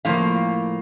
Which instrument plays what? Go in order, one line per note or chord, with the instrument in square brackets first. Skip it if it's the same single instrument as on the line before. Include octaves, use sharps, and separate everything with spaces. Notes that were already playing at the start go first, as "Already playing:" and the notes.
[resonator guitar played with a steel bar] A2 F3 A#3 F5